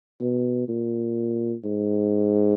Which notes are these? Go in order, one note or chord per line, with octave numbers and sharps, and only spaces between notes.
B2
A#2
G#2